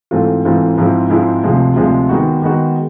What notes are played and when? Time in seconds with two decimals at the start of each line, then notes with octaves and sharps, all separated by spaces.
0.11 G#2 E3 A3 C4 F4
0.45 G#2 E3 A3 C4 F4
0.78 G#2 F3 G#3 C4 E4
1.10 G#2 F3 G#3 C4 E4
1.44 D2 C3 F3 G#3
1.76 D2 C3 F3 G#3
2.09 D#3 G#3 B3 D#4 F#4
2.42 D#3 G#3 B3 D#4 F#4